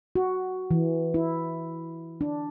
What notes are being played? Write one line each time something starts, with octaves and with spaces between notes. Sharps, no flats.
F#4
E3
E4
D4